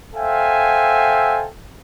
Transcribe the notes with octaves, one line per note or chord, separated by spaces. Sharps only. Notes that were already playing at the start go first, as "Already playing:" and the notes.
A4 C5 E5 F5 G5 G#5